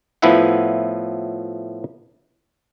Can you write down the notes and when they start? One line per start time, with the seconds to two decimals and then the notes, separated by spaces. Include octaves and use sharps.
0.22 A2 F3 B3 E4 E5 F#5